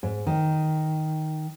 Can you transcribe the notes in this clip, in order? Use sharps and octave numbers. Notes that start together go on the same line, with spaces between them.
G#2
D#3